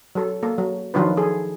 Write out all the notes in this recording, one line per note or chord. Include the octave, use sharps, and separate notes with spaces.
F#3 A4
A#3 A4
F#3
D#3 F3 F#3 D4 F4 B4
G#4 A4